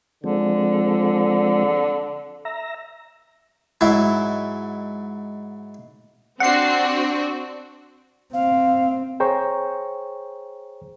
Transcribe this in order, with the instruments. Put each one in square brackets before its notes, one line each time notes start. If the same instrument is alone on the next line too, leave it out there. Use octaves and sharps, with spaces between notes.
[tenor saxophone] D3 [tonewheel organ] F3 G#3 C4
[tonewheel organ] E5 A#5
[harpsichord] G#2 F#3 E4
[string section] C4 D4 F#4 [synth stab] F#5 C7
[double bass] C4 [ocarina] F5
[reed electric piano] G#4 C5 C#5 G5 A#5 C#6